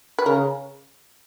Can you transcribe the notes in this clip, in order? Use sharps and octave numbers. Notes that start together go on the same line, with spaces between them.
B4
C#3 A#4